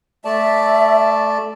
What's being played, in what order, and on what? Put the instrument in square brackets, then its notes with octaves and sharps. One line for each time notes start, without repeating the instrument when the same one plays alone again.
[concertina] A3 D5 A5 [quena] E5